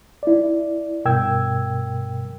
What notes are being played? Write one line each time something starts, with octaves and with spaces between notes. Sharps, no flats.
E4 D5
G2 B2 A#4 G5 E6 G#6